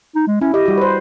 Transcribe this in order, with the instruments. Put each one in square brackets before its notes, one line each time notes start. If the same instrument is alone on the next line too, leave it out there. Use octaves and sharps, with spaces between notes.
[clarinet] D#4
G#3
[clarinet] C#4 [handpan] E4
[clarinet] G4 [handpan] D#5
[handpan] G3 F#4
B4 C5